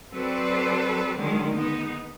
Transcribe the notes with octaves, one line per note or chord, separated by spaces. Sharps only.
F#3 C4 A4 B4 C5 D5
D3 D#3 F#3 G#3
G#3 B3 D#4